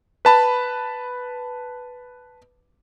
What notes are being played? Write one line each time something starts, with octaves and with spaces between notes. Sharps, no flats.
B4 A5 B5